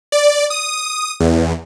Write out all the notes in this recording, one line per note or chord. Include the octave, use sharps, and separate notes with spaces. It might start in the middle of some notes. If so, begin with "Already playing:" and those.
D5
D#6
E2